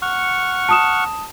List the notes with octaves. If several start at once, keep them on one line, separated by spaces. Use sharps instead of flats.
F#5 C#6 F6
A5 D#6 E7